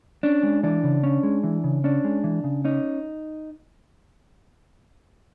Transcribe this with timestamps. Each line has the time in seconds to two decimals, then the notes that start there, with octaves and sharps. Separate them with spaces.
0.23 C#4 D4
0.43 G#3
0.63 E3 D4
0.84 C#3
1.04 C#4
1.23 G#3
1.44 E3
1.64 C#3
1.84 C#4 D4
2.04 G#3
2.24 E3
2.44 C#3
2.65 C#4 D#4